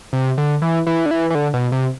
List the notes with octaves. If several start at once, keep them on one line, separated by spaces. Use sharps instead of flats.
C3
D3
E3
E3
D3
E3
E3
D3
B2
C3